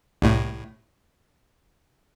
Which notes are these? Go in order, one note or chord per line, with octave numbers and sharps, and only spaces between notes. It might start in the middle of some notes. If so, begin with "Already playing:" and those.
C2 A2